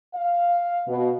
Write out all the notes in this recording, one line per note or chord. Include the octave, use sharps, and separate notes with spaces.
F5
B2